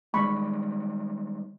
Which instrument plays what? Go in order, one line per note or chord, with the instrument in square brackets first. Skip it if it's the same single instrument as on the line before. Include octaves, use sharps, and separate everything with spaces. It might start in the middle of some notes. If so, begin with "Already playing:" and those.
[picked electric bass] D#3 G3 G#3 [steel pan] B5 C#6